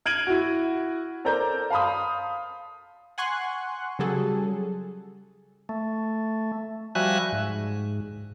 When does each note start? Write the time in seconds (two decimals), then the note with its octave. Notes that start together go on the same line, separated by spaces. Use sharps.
0.06 F6 G#6 D7 D#7 F#7
0.27 E4 F#4
1.25 A4 A#4 C5 D5 A#5 G6
1.70 F5 A5 B5 C6 D#6
3.18 F#5 G#5 C6 C#6 F#6
3.99 C#3 F#3 G3 G#4 A4
5.69 A3
6.95 F3 G3 F#4 E5 G#5 F#6
7.32 G#2